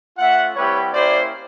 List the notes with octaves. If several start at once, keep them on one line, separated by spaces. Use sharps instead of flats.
A3 C#4 F4 E5 F#5
G3 C4 E4 G4 B4 C#5
A#3 C#4 E4 G4 C5 D5